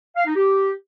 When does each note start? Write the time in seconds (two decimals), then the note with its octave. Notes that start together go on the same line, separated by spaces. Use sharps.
0.16 F5
0.26 D#4
0.35 G4